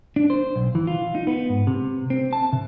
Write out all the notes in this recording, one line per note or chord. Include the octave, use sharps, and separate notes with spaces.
D4
C5
B1
E3
F4
D#4
B3
G#2
C3
C4
A5
C3